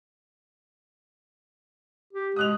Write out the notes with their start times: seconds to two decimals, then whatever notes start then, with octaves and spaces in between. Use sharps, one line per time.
2.13 G4
2.36 G#3 D#6 F#6 F7